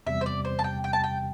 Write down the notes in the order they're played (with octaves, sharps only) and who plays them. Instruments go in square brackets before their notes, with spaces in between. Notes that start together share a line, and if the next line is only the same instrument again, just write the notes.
[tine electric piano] E2 C3 G3 [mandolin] E5
[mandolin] C5
D5
C5
A5
G5
G5
A5
G5